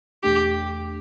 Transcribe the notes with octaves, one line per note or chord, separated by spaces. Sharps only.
E2 B2 A3 D4 G4